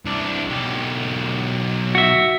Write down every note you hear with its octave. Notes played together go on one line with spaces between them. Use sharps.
C2 D4
B1 G4
F#4 E5